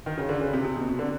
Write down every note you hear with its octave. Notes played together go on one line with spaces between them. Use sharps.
D#3
C#3
D3
C#3
C3
C3
B2
C3
D3